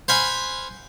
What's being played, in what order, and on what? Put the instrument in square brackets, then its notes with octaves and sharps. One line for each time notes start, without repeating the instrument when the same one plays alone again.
[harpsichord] C5 F5 F#5 G#5 B5